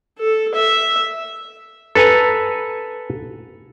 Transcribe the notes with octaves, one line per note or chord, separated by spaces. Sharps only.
A4
E5
A4 B4 G#5 A#5